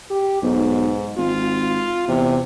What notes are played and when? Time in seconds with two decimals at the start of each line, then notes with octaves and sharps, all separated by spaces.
0.10 G4
0.43 B1 G#2
1.18 G#1 F4
2.08 E2 C3